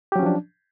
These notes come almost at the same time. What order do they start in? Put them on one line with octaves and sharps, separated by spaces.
G4 F#3 C#4 F3 D4